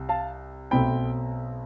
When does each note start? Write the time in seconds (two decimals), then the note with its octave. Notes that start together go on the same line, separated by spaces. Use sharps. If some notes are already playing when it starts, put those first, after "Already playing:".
Already playing: C2 C3
0.09 F5 A5
0.71 B1 B2 A3 C4 G5 B5